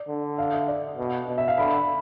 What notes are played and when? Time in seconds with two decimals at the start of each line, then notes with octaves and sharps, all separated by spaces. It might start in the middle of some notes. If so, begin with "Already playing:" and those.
Already playing: D5
0.08 D3
0.38 F5
0.53 E5
0.68 D5
0.98 B2
1.28 B2
1.38 E5
1.48 F5
1.58 D3 B5